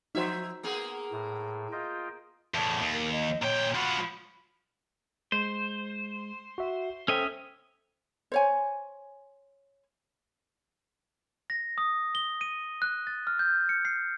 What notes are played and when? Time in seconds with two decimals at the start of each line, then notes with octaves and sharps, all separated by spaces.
0.15 F3 D#4 F#4 C5 E5
0.63 A#3 B3 G#4
1.12 A2
1.72 F4 D#5 G5
2.54 E2 A2 A5
2.81 D#2
2.93 A#4
3.12 D#5
3.43 A#2 C#5 G5
3.75 F3 F#4 B5
5.32 G#3 C5
6.58 F#4 E5
7.08 C#4 A4 C5 D#5 E5 G5
8.32 C5 C#5 G#5
11.50 A#6
11.78 D#6
12.15 G7
12.41 D#7
12.82 F#6
13.07 A6
13.27 F6
13.39 G6
13.69 C#7
13.85 C7